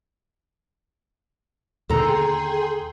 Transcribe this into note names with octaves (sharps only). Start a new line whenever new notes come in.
D#2 B2 D3 G#4 A4 G5 A#5 C6